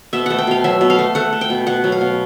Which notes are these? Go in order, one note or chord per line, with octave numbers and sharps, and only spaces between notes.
B2 E5
A3 F#5
G5
B2 F5
F#3 E5
B2
F5
A3
A3 F#5
A3
G5
B2
B2 F#5
F#3
F5
B2